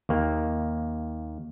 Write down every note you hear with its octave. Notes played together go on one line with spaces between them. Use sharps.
D#2 A#3